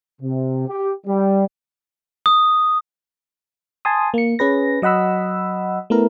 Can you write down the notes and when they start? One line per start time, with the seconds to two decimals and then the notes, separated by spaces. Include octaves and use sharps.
0.22 C3
0.68 G4
1.07 G3
2.26 D#6
3.85 G#5 A5 C6 D#6
4.14 A#3 C#7
4.39 C#4 G#4 B4 A#6
4.82 F#3 D#5 F#5 B5 E6
5.90 A3 B3 E4 A#4